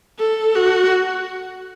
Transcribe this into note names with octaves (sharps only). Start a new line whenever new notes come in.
A4
F#4